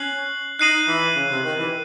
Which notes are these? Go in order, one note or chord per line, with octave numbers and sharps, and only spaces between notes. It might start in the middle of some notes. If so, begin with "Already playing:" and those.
Already playing: C#4 F#6 C7 F#7
D#4 F#6 C7 D#7 F#7
E3
C#3
C3
D#3
E3